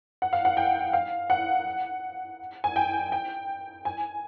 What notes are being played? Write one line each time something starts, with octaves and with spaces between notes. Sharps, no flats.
F#5
F5
F#5
G5
F5
F#5
G#5
G5
G5
G#5